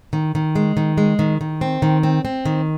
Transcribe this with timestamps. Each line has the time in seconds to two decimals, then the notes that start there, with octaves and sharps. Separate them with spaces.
0.13 D#3
0.35 D#3
0.55 G#3
0.77 D#3
0.98 G#3
1.19 D#3
1.41 D#3
1.61 C4
1.82 D#3
2.03 C4
2.25 C4
2.45 D#3